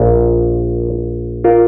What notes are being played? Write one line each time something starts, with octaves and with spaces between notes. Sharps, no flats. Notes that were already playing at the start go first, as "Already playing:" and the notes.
Already playing: A#1 A#2 F4 A#4
F4 A#4